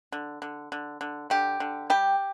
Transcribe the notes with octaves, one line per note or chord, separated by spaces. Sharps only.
D3
D3
D3
D3
D3 G4
D3
G3 G4